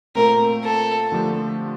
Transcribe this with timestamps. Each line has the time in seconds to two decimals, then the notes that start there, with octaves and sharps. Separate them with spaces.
0.15 A#2 A3 C4 A#4
0.65 A4
1.12 D3 F3 A3 D4 G4